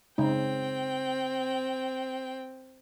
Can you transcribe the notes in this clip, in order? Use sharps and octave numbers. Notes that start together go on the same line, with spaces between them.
C#3 G#3 C4 D#4 G5